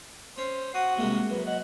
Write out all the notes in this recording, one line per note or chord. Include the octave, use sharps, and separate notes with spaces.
C#4 C5
F#4 F#5 D#6
C2 C3 G#3 A#3
F#2 B4
D#5 F#5